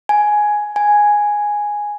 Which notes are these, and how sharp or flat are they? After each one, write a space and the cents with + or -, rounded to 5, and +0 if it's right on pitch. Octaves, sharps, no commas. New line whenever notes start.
G#5 +10
G#5 +0